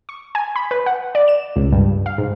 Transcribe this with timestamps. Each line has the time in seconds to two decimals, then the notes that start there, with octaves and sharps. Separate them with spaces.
0.09 C#6
0.35 G#5
0.56 B5
0.71 B4
0.86 F#5
1.15 D5
1.28 E7
1.56 C#2
1.72 G2
2.06 F5
2.18 G#2